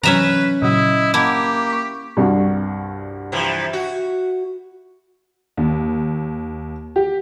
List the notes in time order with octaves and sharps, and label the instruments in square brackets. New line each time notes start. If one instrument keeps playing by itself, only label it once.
[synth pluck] C3 E3 F#3 [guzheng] C#4 E5 A#5 [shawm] B4
[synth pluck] A#2 C#3 F#3 [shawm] E4 [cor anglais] D#5
[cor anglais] A#3 [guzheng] E4 [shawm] G4 [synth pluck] F#5 A5 G6
[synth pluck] C#6 B6
[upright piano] C2 G2 F#4
[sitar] C3 E3 F3
F#4
[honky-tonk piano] D#2
G4